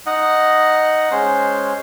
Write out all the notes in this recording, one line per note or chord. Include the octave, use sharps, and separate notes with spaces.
D#4 D#5 F#5
G#3 C#4 C5